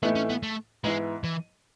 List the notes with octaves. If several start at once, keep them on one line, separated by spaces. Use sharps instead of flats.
A2 E3 A3 B3 D#4
C#4
B3
A3
G#2 E3 G#3 B3 E4
E3